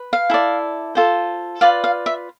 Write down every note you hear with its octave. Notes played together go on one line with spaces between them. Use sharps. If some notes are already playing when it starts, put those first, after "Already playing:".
Already playing: B4
F5
E4 A4 D5
F4 A4 C5
F4 B4 D5 F5
F5
E5